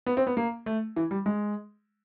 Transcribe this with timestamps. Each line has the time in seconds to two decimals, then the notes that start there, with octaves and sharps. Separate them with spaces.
0.06 B3
0.17 C4
0.27 B3
0.37 A#3
0.66 A3
0.96 E3
1.11 G3
1.26 G#3